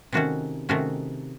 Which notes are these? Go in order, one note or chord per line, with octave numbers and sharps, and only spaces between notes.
C3 D#3 A3 C#4 F#4
C3 D#3 A3 C#4 F#4